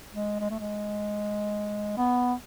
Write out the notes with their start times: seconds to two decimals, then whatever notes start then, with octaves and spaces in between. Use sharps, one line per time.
0.14 G#3
0.40 G#3
0.51 A3
0.60 G#3
1.98 B3